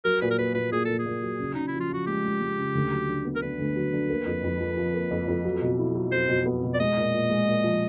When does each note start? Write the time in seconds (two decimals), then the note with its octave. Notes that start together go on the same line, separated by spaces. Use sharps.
0.05 F#3 A#4
0.22 A#2 B4
0.31 A#4
0.38 A#3 B4
0.55 A#2 B4
0.72 A#2 G#4
0.85 A#2 A4
0.99 G#4
1.06 A#2
1.22 F#3
1.39 C#3
1.54 C#3 D#4
1.68 E4
1.73 F3
1.80 F4
1.90 F3 F#4
2.07 G#3 G4
2.24 G#3
2.40 G#3
2.58 C#3
2.75 D2
2.92 F#3
3.08 D3
3.25 B3
3.36 A#4
3.42 D3 B4
3.59 D2
3.76 F#3
3.93 D3
4.10 A#3
4.26 F2
4.43 F2
4.60 F3
4.77 F3
4.94 A#3
5.11 F2
5.28 F2
5.45 F#3
5.62 B2
5.79 E4
5.95 F#3
6.12 F#3 C5
6.29 B2
6.46 B3
6.63 B2
6.74 D5
6.80 G#3 D#5
6.97 A#2
7.14 A#2
7.30 G#3
7.47 A#2
7.64 F3